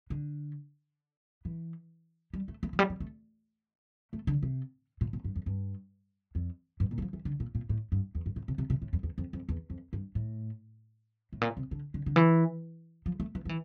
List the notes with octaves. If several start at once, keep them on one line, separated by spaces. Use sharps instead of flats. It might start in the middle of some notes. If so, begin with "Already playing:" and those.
D3
E3
G3
A3
A3
F3
G3
F3
A3
A3
D3
C3
A#2
A#2
G2
F2
G2
F2
G2
A#2
E3
F3
E3
D3
A#2
A#2
A2
G2
E2
G2
A2
C3
C3
C3
A2
F2
E2
F2
F2
E2
F2
G2
A2
A2
A#2
C3
D3
D3
D3
E3
F3
A3
E3
F3
E3